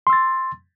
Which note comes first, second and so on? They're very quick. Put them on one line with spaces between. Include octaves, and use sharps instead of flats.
C6 E6 A6